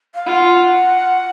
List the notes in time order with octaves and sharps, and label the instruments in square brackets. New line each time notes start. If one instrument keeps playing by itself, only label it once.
[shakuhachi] F5
[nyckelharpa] F4 [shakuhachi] F#5